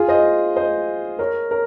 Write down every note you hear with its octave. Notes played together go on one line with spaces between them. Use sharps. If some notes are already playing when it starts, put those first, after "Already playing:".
Already playing: F4 G#4
C5 D#5
C5 D#5
A#4 C#5
A#4 C#5